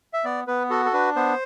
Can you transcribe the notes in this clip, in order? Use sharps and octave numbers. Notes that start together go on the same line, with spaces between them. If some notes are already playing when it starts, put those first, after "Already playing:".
E5
B3 D5
B3 B4
F#4 A4
A4
D4 B4
B3 C5